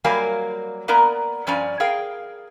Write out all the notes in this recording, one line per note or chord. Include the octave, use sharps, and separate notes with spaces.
F#3 G3 A#3 A#4 F5 G#5
A#3 B3 A#4 D5 A#5
G2 F3 C#4 D5 G#5 A#5
G#4 A#4 F5 G5